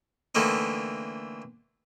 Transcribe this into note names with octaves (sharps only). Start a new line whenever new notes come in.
D3 E3 A3 A#3 C4 D#4